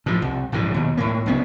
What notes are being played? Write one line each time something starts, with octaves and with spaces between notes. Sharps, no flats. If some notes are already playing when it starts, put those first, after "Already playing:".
A2 F3
C2
A#1 G#2 C#3 E3
D#2 B2
A2 A#3
C2 C#3 B3 C#4